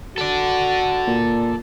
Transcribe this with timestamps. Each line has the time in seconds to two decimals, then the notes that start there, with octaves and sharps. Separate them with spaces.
0.18 F#4 A4 D5
1.07 A#2